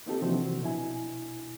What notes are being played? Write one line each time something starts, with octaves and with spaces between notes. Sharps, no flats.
A#3 C4 D#4 F4 G4 A4
C3 E3 F3 C4 D4 F#4
B2 D4 E4 G#5